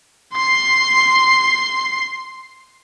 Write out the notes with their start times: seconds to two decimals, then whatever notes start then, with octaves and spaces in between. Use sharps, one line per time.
0.33 C6 C7